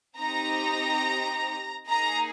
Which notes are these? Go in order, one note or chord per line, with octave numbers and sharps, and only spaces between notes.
C4 D#4 G4 A#5
A#3 D#4 G#4 A#5